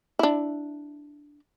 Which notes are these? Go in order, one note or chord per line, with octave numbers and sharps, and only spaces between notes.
D4 E4